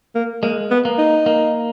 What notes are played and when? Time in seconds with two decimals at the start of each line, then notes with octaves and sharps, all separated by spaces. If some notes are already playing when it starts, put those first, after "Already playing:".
0.15 A#3
0.43 G#3 A#3
0.71 B3
0.85 A#3
0.98 D#4
1.26 A#3